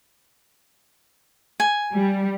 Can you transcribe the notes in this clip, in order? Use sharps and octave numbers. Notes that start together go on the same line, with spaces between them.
G#5
G3